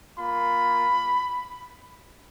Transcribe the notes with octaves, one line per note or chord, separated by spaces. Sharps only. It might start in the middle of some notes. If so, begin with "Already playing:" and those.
A#3 F4 B5